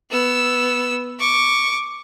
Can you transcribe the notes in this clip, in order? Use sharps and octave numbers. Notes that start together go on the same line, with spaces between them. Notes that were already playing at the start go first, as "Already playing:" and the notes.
B3 E6
C#6 D6